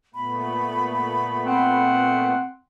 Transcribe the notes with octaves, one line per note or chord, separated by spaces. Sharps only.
A#2 A3 B3 B5
C4 F#5